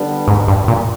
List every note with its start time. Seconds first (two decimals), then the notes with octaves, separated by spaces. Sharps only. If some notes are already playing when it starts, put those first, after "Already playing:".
Already playing: D3 G3 B3 D4
0.28 G#2
0.48 G2
0.68 A#2